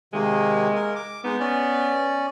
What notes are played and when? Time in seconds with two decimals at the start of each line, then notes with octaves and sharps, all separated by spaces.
0.13 C3 D#3 G#3 A#3
0.75 A#4
0.96 D6
1.24 G#3 B3 D#4
1.40 C#4 D5